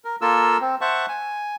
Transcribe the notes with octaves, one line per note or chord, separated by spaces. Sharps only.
A#4
A#3 F4 A4 A#4 E6
C4
C5 E5 F#5 A5 C#6
G#5